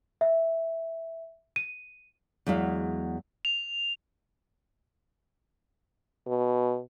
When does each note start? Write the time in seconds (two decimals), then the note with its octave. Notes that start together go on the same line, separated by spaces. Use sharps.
0.21 E5
1.56 D#7
2.46 E2 F#3 G#3 E4 F5
3.45 F7
6.27 B2